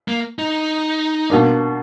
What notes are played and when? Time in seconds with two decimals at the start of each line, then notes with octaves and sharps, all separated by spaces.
0.08 A#3
0.39 D#4
1.30 B2 A#3 D4